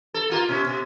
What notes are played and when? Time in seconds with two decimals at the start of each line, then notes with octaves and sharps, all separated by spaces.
0.14 A4
0.30 A#3 F4 A#4
0.49 B2 C#4
0.67 B2